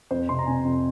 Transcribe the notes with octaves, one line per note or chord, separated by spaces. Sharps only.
F2 C5
C3 C6
A#5
C3 G#5
F2